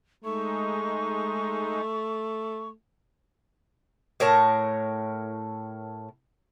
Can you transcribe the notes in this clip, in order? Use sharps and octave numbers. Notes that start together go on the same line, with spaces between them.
G#3 A3 D#4 C#6
A2 A#4 C#5 A5